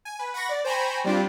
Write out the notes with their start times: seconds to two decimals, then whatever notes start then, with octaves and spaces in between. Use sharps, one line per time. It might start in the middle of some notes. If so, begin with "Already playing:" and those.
0.05 G#5
0.19 B4
0.34 F#5 B5 C#6 A#6
0.49 D5
0.65 C5 G5 G#5 A#5 B5 C#6
1.04 G3 C4 D4 F4 G4